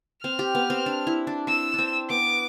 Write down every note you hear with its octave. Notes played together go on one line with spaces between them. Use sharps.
C4 F6
G4
B3
C4
D4
E4
D4
C4 E6
C4 D4
B3 D6